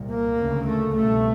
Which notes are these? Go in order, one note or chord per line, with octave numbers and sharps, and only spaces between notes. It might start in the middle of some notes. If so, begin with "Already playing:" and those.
Already playing: C2 A#2
A#3
D2 C#3
A3
C2 B2 A3